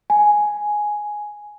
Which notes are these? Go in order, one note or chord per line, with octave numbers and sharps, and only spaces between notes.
G#5